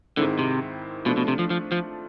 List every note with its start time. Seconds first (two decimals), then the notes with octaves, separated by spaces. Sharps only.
0.17 G#2 D3 D#3 G#3 C4 E4
0.39 C3
1.05 B2 F3 A3 D4 F4
1.17 B2
1.28 C3
1.39 F3
1.50 F3
1.72 F3